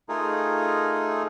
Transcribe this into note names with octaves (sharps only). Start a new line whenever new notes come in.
A3 D#4 F4 G#4 A#4